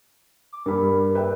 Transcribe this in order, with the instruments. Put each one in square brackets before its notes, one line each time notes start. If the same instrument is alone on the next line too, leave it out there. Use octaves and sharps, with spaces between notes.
[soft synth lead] D6
[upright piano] G2 G3 B5 [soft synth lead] A#4
[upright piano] B4 E5 G5